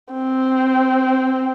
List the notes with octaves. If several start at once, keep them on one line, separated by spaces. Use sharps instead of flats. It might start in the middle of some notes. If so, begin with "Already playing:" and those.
C4